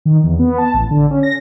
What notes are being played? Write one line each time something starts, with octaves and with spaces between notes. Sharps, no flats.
D#3
E2
B3
A5
A1
D3
C#4
A#6